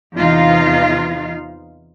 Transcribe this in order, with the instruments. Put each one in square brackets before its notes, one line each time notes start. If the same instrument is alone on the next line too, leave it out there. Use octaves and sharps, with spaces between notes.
[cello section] E2 C3 E3 D#4 F4 F5